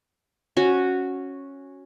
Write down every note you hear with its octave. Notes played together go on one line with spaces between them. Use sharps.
C#4 F#4